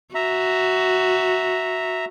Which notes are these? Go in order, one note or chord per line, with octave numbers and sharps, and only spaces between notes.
F#4 E5 A#5